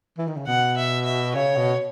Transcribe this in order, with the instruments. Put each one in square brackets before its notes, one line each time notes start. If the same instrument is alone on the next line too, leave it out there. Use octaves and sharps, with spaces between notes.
[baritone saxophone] E3
D#3
C#3
[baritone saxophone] B2 [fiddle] F#5
[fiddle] E5
E5
[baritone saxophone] C#3 [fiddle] C#5
[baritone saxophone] B2